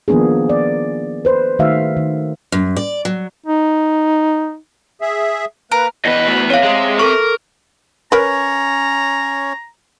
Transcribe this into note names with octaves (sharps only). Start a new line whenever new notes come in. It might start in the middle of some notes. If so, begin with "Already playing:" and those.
D#3 F3 A#3 B3 D4 G#4
D5
B4 C5
D#3 A3 F#4 E5 F5
D#3
F#2
D5
F#3
D#4
G#4 E5
A#3 A#4 B4
E2 B4 D#5
A3 F#4
C4 C#5 E5 F5
G#3
A4 A#4 C#6
C#4 A#4 B4 C#5 A#5